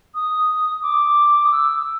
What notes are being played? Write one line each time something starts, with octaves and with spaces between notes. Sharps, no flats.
D#6
D6
D#6
E6